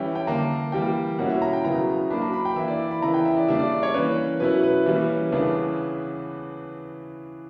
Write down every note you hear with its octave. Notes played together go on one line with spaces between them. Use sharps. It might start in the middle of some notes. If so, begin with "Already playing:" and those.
Already playing: E3 G3 C#4 E4 G5
G5
D3 A#3 D4 A#5
E3 G3 A#3 G5
B2 A#3 C#4 E4 F#5
E5
A#5
G5
C#3 F#3 B3 E4 A#5
F#3 A#3 D4 B5
A#5
B5
G5
E3 A#3 E4 E5
D5
E5
B5
C#3 E3 B3 E4 A#5
G5
E5
D5
C#3 G3 A#3 D4 E5
D5
D5
C#5
E3 A#3 C#4 B4
B2 F#3 C#4 E4 B4
B4
E3 G3 A#3 C#4
C#3 E3 B3 D4